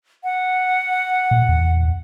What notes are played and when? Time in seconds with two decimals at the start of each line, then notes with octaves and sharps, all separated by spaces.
0.24 F#5
1.31 A#2
1.49 E2